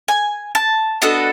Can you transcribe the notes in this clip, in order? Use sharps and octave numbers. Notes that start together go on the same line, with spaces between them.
G#5
A5
B3 D4 F#4 A4 D#5